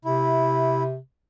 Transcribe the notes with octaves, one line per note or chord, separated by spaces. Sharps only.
C3 E4